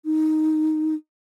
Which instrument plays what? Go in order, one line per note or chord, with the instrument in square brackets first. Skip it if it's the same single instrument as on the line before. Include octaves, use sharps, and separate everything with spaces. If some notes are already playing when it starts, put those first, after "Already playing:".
[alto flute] D#4